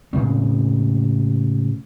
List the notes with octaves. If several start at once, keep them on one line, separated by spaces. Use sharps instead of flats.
A2 C#3 G#3 C4